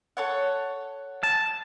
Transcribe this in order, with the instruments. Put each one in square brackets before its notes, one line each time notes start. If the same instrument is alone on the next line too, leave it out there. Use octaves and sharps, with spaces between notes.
[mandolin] A4 C#5 F#5
[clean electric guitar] A5